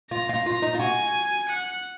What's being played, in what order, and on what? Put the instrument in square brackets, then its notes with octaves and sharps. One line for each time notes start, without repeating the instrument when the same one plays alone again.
[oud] F4 [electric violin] A#5
[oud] F4
F4
D#4
F4
[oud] F#4 [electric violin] G#5
[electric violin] F#5